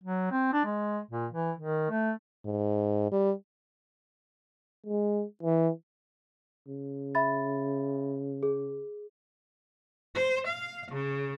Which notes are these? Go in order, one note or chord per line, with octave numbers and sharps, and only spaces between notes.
F#3
C4
D4
G#3
A#2
E3
D#3
A3
G#2
G3
G#3
E3
C#3
E5 B5 A6
G#4
C5
F5
C#3